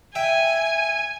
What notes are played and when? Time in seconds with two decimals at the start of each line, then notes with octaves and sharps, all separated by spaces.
0.15 E5 G5 G#5